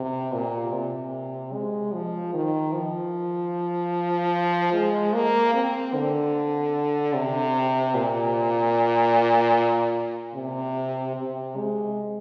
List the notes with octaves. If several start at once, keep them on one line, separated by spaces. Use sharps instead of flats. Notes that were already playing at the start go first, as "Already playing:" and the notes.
Already playing: C3
A#2
C3
G#3
F3
D#3
F3
G#3
A#3
C4
D3
C3
A#2
C3
C3
G#3